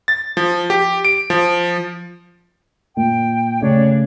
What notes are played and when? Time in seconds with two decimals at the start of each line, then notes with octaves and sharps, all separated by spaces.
0.08 A6
0.37 F3
0.70 G4
1.05 D7
1.30 F3
2.97 A#2 G5
3.61 C#3 A3 D4 C#5